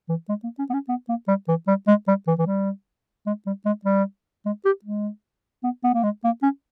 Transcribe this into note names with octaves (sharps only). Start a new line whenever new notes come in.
E3
G#3
A#3
C#4
B3
C#4
B3
A#3
G3
E3
G3
G#3
G3
E3
E3
G3
G#3
G3
G#3
G3
G#3
G4
G#3
B3
B3
A#3
G#3
A#3
C#4